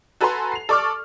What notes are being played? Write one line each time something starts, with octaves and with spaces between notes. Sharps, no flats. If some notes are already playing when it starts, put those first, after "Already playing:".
F#4 A4 B4 G#5 A#5 C6
C7 F7
A4 D5 C#6 D6 F6